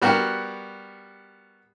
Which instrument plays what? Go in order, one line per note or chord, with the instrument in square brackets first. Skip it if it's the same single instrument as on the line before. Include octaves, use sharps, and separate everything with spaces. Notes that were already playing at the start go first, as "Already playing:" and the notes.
[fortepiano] G3 B3 F#4 G4 A#4